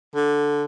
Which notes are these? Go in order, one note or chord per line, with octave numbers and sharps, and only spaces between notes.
D3